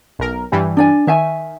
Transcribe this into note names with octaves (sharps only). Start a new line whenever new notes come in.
B1 A#4
G2 E3 G3
D4 D5 G#5
D#3 C#5 E5 G#5